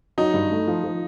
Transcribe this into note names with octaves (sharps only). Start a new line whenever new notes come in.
F#3 D#4
G2
A3
F3
F3